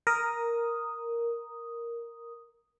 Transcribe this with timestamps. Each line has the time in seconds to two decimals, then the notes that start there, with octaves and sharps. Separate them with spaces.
0.07 A#4 D#6